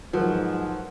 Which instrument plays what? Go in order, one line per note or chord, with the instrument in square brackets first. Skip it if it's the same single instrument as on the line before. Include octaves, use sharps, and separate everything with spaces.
[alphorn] G#2 [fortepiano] F3 [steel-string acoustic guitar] F#3 [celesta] A#4 B4 F#5